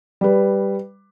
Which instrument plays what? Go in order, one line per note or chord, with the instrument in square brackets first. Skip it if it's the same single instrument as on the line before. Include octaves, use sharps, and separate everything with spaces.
[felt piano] G3 B4